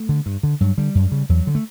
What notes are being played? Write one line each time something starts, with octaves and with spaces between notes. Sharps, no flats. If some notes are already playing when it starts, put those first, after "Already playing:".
Already playing: A3
D3
G2
D3
G2 F#3
D3 G3
F#2
C#3
E2 F#3
D3
A3